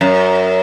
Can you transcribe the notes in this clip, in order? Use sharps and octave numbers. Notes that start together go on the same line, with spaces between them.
F#2